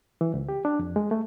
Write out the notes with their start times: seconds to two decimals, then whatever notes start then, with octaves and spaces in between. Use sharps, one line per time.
0.21 E3
0.34 C#2
0.49 G4
0.65 D4
0.79 F2
0.96 G#3
1.11 A3